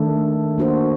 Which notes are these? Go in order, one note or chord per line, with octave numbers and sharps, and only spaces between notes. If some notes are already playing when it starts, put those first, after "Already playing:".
Already playing: D#3 A3 D4 A4
A#3 D4 F#4 A4 C5